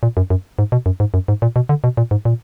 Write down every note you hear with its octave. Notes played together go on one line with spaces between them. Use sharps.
A#2
F#2
F#2
G#2
B2
F#2
G#2
F#2
G#2
A#2
B2
D3
B2
A#2
G#2
A#2